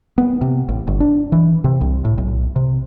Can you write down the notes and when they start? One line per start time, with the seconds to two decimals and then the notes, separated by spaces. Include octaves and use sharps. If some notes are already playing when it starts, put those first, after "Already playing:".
0.18 B3
0.41 C3
0.69 A1
0.87 G1
1.00 D4
1.32 E3
1.64 C3
1.81 C2
2.05 A2
2.18 B1
2.56 C3